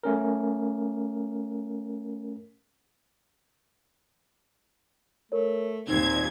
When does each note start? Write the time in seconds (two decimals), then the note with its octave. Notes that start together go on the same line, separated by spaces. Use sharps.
0.03 A3 C#4 A#4
5.32 A3 A#4 C#5
5.88 D#2 A#2 C4 D#4 G#6